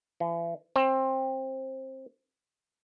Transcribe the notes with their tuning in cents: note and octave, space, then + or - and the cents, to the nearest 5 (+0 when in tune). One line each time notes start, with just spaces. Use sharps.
E3 +40
C4 +20